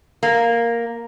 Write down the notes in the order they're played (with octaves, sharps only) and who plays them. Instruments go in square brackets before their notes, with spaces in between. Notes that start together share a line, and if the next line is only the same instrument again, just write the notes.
[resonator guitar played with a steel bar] A#3